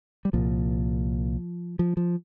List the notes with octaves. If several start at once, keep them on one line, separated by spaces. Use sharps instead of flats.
G3
C2 A#2 F3
F3
F3